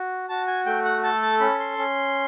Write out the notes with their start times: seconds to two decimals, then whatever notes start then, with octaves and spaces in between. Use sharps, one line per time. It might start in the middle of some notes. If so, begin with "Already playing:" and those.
Already playing: F#4
0.29 F#4 A5
0.47 G#5
0.66 A3 G5
0.85 F#5
1.03 A4 A5
1.22 A5
1.40 C#4 B5
1.59 C6
1.78 C#4